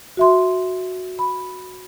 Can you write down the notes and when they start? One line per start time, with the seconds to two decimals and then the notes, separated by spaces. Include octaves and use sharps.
0.17 F#4 E5 C6
1.19 B5